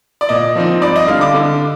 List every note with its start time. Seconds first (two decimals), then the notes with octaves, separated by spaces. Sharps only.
0.21 D5
0.29 A#2 D#5
0.56 F3 C4 D#4
0.82 G2 D5
0.96 D#5
1.08 D3 G3 D4 F5
1.21 D6
1.34 D3